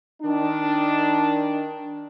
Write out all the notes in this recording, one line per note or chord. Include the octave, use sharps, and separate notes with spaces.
D#3 D4